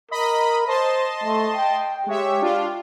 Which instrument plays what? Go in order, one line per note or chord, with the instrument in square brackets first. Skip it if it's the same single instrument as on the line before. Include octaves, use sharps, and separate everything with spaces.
[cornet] A#4 [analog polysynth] D#5 B5
[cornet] C5 [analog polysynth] D#5 A5 C6
[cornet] A3
G5
[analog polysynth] G#3 C#5 E5 [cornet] G4
[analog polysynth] D4 F4